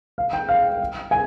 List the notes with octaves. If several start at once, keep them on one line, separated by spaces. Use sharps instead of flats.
F5
G5
F5
G#5